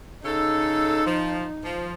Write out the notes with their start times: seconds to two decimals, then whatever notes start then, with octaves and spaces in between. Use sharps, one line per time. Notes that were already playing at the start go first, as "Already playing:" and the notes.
0.25 C#3 D#4 A4
1.04 F3
1.62 F3